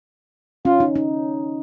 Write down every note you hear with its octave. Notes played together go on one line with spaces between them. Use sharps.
C#4 F4
D#4
D#4